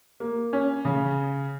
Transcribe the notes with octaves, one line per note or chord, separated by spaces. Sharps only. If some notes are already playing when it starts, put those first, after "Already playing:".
A#3
C#4
C#3